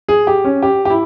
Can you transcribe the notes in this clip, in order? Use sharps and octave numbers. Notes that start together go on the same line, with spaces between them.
G#4
G4
C#4
G4
G4
E4